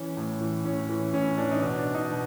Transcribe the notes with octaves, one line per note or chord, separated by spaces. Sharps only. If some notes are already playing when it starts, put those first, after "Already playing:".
Already playing: E3 C#4
A2
E3
A2 C#4
E3
A2 C#4
E3 D4
D#4
B2 D4
D4
D#4
B2